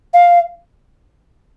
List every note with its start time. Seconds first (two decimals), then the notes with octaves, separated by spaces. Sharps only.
0.14 F5